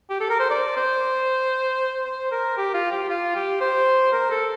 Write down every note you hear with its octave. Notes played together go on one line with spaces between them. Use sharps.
G4
A4
A#4
C5
D5
C5
C5
A#4
G4
F4
G4
F4
G4
C5
A#4
A4